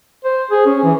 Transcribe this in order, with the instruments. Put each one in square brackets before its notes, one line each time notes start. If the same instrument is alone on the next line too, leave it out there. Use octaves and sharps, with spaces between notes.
[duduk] C5
G#4
C#4
E3